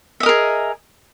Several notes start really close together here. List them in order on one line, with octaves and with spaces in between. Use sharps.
E5 D#5 A#4 G#4